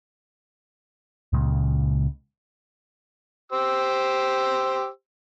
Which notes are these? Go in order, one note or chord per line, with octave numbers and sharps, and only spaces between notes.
C#2 A#2 C#3 G#3
G4 C5 E6